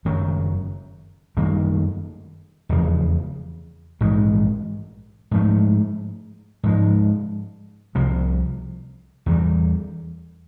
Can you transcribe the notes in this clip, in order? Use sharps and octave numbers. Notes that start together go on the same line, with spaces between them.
F#1 F#2 D#3 F#3
F#2 D#3 G3 A#3
F1 E2 C#3 F3
A#1 G#2 E3 G#3
G#2 F3 A3
G#2 F3 G#3
C2 C3 F3
E2 C#3 E3 G3